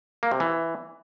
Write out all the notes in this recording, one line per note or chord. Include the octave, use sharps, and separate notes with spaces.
A#3
C3
E3